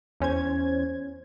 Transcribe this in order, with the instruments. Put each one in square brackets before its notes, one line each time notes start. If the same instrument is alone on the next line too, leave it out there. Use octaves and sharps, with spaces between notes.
[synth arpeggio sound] E2 C#4 C5 G#6